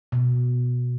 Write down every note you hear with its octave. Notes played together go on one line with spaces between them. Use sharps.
B2